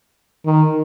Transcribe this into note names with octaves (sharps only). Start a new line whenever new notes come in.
D#3